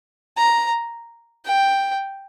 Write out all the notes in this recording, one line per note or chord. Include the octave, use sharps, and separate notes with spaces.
A#5
G5